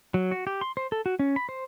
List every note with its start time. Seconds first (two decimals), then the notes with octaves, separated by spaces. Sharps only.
0.14 F#3
0.31 F#4
0.47 G4
0.61 C6
0.77 C5
0.92 A4
1.06 F#4
1.19 C#4
1.36 B5
1.49 C5